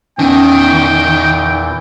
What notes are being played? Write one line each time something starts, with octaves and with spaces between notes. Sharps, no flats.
E2 A#2 D#3 E3 B3 C#4 G5